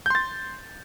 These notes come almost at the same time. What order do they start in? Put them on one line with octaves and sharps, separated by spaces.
G6 C6 A6